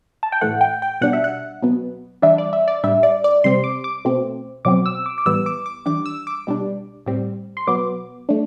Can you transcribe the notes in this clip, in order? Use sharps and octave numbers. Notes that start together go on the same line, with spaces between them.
A5
G5
A2 E3 A3 F#5
G5
G5
B2 G3 D4 F#5
E5
F#5
B2 F#3 B3
E3 G3 D4 E5
D5
E5
D5
A2 G3 D4 E5
D5
D5
C3 G3 C4 C6
D6
D6
B2 A3 C4
B2 F#3 C4 D6
E6
D6
D6
A2 E3 G3 B3 E6
D6
D6
E3 G3 D4 D6
E6
D6
B2 G3 D4
A2 G3 C4
C6
B2 F#3 B3 D6
A3 D4